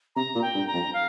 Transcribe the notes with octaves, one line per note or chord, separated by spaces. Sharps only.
C3 A#5
A#2
G5
G2
A#5
F2
F5